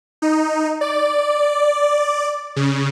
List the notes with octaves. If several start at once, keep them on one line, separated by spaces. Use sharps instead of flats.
D#4
D5
C#3